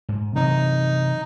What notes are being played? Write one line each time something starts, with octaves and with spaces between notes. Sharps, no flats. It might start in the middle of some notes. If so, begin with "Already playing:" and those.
G#2
C3 E3 F#3 D#4